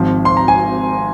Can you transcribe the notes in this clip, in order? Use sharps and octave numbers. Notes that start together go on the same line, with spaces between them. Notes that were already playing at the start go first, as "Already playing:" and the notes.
Already playing: G#1 G#2 F3 C4
C6
A#5
G#5